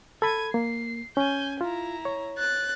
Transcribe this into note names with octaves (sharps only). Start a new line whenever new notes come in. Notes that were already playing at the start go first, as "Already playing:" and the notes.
A4 B5 G#6 D#7
A#3 C7
C#4 G#5 G6
E4 F4 A#5
C#5
F#6 A6